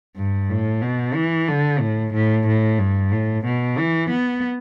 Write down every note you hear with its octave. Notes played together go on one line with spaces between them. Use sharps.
G2
A2
B2
E3
D3
A2
A2
A2
G2
A2
B2
E3
B3